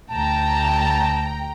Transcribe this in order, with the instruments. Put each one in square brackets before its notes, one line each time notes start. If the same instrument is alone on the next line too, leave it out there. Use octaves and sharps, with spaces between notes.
[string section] D2 G5 A#5 [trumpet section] A5